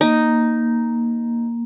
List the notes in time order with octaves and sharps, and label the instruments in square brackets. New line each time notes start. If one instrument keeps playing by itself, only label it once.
[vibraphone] A#3 [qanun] D#4